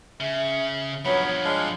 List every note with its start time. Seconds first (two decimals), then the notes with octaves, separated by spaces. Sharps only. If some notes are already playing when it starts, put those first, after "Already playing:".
0.20 C#3 E5
1.05 G2 F3 F#3 B3 C#5 B5
1.45 G#3 D4 F5